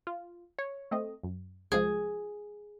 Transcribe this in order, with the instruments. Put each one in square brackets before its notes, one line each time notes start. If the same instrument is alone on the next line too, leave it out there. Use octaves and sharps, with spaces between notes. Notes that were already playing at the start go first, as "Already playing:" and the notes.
[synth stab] F4
C#5
A3 C4 D#5
F#2
[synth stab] C2 F3 G#3 [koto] G#4